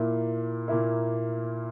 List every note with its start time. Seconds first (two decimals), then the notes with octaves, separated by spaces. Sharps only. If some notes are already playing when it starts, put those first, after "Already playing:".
Already playing: A#2 A#3 E4
0.68 A#2 A#3 E4